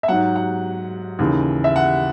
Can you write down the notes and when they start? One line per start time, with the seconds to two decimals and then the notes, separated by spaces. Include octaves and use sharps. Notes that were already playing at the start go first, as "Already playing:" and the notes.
0.03 E5
0.08 G#2 F#3 F#5
0.36 F#5
1.19 D#2 C#3 E3
1.64 E5
1.76 F#5